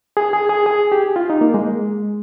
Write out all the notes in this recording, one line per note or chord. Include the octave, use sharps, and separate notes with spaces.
G#4
G#4
G#4
G#4
G4
F4
D#4
A#3
G#3